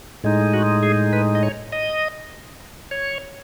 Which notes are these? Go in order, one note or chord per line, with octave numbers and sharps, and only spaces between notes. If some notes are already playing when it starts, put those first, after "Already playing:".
A2 G#3 D#4
F#4
G#4
B4
D#5
C#5
D#5
C#5